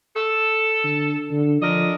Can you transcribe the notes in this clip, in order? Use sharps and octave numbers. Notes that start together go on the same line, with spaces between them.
A4
D3
D3
D3 F3 A#4 D#5